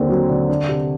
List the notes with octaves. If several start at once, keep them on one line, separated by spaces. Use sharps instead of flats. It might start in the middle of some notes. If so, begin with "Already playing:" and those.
Already playing: D#2 D3 C4
F#3
D3
D4
C3